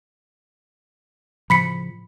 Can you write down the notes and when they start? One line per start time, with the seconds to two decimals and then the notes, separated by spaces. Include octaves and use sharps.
1.50 A2 C#3 F3 B5 B6 C#7